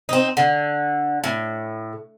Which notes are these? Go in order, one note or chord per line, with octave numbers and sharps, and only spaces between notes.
C4 D#4
D3
A2